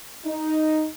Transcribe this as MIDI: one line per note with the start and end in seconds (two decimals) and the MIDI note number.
0.25 0.87 63